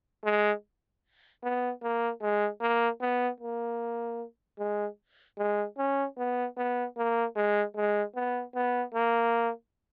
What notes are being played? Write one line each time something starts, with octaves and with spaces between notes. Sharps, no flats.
G#3
B3
A#3
G#3
A#3
B3
A#3
G#3
G#3
C#4
B3
B3
A#3
G#3
G#3
B3
B3
A#3